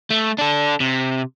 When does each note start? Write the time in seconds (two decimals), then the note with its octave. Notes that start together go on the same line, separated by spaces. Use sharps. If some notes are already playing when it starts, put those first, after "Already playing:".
0.10 A3
0.38 D4 A4
0.80 C3